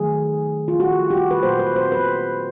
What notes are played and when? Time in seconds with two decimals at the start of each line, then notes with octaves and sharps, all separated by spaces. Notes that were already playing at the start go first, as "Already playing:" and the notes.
Already playing: D#3 F#3 A3 G#4
0.68 F4
0.80 F#4
0.92 G4
1.10 G4
1.17 F#4
1.31 B4
1.42 A#2 F#3 A#3 C5
1.59 B4
1.76 C5
1.92 B4